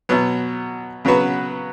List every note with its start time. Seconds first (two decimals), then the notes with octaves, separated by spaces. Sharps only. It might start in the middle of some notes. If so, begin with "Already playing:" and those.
0.09 B2 F#3 B3
1.05 C#3 F#3 B3 F#4 B4